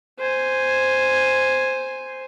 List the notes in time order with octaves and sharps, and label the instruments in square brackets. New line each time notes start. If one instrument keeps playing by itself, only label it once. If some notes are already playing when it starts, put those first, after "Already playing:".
[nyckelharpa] C5 G#5